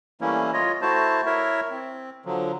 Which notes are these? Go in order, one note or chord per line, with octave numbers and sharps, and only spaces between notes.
E3 G3 A3 A#3 C#4 E4
F4 C#5 D#5
A3 E4 F#4 C5 A5
E4 A#4 C#5 E5
C4
D3 F3 F#3